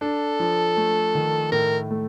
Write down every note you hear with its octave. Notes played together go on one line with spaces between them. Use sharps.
D4 A4
F3
A3
D#3
A2 A#4
A3